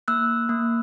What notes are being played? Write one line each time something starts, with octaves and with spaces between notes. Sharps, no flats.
A#3 E6 F#6
A#3